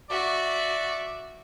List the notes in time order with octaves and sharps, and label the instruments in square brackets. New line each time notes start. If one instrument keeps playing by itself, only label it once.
[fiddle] F#4 E5 [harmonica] D5